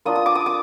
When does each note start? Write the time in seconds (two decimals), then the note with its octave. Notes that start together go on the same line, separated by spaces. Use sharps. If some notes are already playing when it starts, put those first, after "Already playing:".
0.05 A#3 D4 F4 D#6
0.16 D#6
0.26 D6
0.35 D#6
0.46 D6